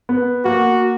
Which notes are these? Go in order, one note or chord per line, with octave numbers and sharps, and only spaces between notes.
B3
A#3 F#4